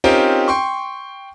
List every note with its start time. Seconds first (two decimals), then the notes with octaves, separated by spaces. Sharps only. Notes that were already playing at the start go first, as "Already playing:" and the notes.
0.04 C4 C#4 D#4 F4 G4 A#4
0.48 G5 C6 C#6